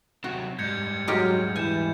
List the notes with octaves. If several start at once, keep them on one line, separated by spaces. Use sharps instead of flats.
C3 F#3 F#4
G#2 G3 G6 G#6 C#7
F#3 G#3 G4 A#4
E3 G#5 G6 E7